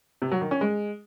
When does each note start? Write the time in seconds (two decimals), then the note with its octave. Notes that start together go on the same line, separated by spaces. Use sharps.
0.22 C3
0.31 F#3
0.41 D#3
0.51 C#4
0.61 G#3